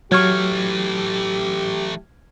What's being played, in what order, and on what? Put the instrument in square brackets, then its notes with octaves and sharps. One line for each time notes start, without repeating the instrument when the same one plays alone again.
[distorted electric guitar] E3 A3 [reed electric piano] F#3 [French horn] G4 [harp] C#6 F6 G#6